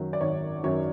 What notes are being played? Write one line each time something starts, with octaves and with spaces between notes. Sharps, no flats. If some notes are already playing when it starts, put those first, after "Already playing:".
Already playing: F#2 D#3 F#3
D5
G#1 C#5
F#2 D#3 F#3 C#5